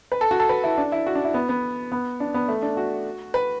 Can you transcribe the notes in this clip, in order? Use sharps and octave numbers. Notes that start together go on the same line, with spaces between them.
B4
A4
F#4
A4
B4
E4
D4
E4
F#4
D4
E4
B3
B3
B3
D4
B3
A3
D4
F#4
B4